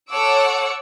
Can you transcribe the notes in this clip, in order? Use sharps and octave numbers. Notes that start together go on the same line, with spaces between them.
A4 C#5 F#5 D6 E6